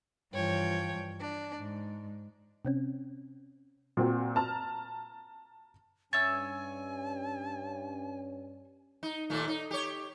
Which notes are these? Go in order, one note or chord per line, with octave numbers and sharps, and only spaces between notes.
G2 E3 F3 C#5 G5
D4
G#2
C3 C4 C#4
A#2 C4 F#4
A5 A#5 F6
G2 C#4 C#5 E5 G#5 E6 A6
D#4
D#2 A#2 A3
D#4
G4 C#5